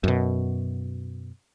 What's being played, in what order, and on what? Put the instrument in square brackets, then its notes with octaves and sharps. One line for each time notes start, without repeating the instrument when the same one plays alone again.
[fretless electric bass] F#2 B2